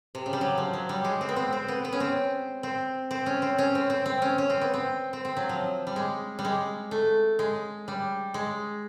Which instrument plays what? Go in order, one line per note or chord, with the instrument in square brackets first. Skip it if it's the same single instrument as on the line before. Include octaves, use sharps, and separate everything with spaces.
[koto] C3
C#3
G3
F#3
F3
F#3
G3
G#3
C4
B3
C4
C4
B3
B3
C#4
C4
C4
C4
C#4
C4
C#4
C4
C4
C4
C#4
C#4
C4
B3
C4
C4
C4
F#3
F3
G3
G#3
G3
G#3
A3
G#3
G3
G#3